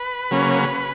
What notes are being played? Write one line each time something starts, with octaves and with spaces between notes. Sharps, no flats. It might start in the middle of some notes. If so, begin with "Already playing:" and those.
Already playing: B4
C#3 F#3 A#3 C#4